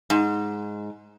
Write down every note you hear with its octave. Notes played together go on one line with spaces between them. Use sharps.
G#2